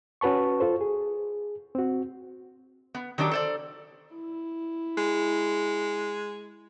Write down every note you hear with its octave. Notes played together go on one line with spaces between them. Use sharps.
C#4 F#4 B4 A5 C#6
F4 A4 C5
G#4
C4 F#4
B3
D#3 F#3 D4 F#4 G4
A4 C5 D5
E4
G#3